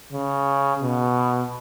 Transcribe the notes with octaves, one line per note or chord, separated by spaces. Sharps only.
C#3
B2